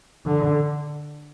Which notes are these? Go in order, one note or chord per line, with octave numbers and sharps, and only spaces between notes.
D3